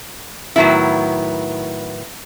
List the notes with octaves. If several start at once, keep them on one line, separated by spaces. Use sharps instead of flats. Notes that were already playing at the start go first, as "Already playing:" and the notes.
A2 D#3 F#3 B3 E4